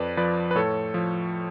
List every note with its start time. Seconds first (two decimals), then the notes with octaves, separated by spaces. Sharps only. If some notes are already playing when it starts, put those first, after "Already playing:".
Already playing: F2 B4 D5
0.17 F3 B4 D5
0.51 B4
0.55 A2 A4 C#5
0.94 F3